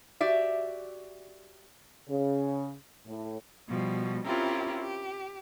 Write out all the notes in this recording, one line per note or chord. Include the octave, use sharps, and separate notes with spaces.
F#4 G4 D5 E5
C#3
A2
B2 F3 G3
C4 C#4 E4 F4 G4 A#4
G4